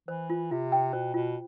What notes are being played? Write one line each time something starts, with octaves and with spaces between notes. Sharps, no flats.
E3 C5
F4
C3 F4
G5
B2 C5
B2 F4